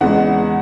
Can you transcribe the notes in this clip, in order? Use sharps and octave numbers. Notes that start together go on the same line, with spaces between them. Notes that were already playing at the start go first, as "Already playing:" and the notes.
E2 C#3 G#3 F#5